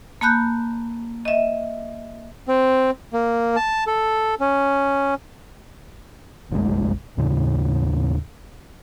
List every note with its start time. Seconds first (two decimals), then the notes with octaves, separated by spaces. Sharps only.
0.21 A#3 A5 B5 F#6 G6
1.25 D#5 E5
2.47 C4
3.13 A#3
3.56 A5
3.87 A4
4.40 C#4
6.51 F#1 B1 C3 G#3
7.17 D#2 A2 C#3